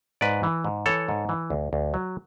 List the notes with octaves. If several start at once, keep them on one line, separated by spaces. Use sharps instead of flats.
G#2 B4 D5
E3
G#2
E3 A4 C#5
G#2
E3
D2
D2
F#3